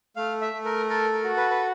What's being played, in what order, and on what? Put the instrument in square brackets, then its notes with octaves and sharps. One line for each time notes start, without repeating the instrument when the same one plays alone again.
[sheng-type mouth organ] A3 F5
E5
A3
A#4
A4 A#4
A#4
F#4
B4
B4